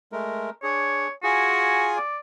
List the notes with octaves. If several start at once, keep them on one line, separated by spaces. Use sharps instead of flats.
G#3 A3 A#4
D4 G#4 C#5
F4 F#4 G#4 G#5
D5